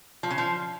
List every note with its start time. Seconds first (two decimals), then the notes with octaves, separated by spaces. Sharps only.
0.23 F3
0.30 C#3
0.38 F3